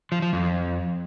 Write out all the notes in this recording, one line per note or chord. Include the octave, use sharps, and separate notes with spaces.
F3
F3
F2